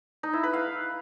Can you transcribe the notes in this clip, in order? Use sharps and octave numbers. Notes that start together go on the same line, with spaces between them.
D#4
E4
B4
F5